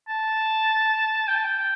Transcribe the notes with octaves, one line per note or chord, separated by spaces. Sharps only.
A5
G5
A5
G5
G5